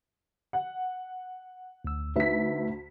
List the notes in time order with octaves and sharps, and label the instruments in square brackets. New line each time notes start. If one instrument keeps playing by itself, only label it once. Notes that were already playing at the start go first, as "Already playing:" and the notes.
[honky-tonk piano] F#5
[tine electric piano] D2 E6
[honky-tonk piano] D2 B6 [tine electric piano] D#4 B4 E5